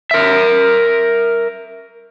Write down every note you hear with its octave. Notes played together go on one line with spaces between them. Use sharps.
A#4 E5